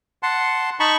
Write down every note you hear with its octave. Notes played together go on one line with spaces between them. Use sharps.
F#5 A5 C6
D#4 A5 B5 C#6